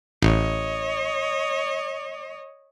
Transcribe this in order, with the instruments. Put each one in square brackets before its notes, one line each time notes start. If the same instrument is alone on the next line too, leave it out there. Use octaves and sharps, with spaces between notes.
[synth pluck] A1 [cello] C#5 D#5